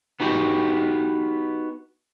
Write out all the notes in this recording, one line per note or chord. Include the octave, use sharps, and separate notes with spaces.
B3 D#4 F#4 G4